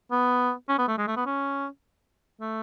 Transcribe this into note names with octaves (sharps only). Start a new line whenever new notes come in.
B3
C#4
B3
A3
G#3
A3
B3
C#4
A3